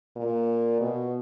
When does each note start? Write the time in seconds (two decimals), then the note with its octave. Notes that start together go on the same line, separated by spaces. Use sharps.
0.17 A#2
0.80 B2